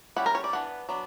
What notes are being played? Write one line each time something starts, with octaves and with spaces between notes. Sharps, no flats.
G3 C#4 E4 F#5
A#4
C#5
D5
E3 B3 D4 F#5
F#3 B3 D4